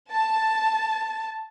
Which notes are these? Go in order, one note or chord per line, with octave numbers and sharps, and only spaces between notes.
A5